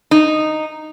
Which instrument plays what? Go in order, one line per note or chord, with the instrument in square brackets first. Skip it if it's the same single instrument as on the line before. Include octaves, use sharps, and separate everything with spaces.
[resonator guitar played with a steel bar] D#4